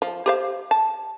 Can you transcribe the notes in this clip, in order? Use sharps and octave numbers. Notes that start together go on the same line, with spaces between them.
F3
G4 C5 F5
A5